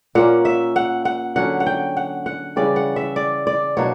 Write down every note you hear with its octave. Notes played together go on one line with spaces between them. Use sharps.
A#2 A#3 C#4 F#5
E5
F#5
F#5
D3 F#3 C#4 F#5
F#5
G5
F#5
F#5
C#3 E3 G3 C#4 D5
F#5
E5
D5
D5
B2 F#3 A#3 D4 C#5